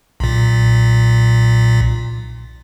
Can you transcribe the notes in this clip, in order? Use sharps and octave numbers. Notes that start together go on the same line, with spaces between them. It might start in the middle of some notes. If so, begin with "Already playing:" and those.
B1 A#2